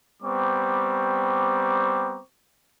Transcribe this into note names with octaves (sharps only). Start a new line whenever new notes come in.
G3 B3 C4 A#5 C#6 D6